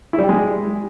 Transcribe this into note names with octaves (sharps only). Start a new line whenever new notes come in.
E4
G3
G4
G#3